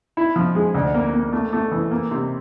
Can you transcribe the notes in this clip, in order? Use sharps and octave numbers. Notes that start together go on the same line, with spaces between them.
E4
F3
G#3
D2
A#3
A#3
A3
A3
E3
A#3
C3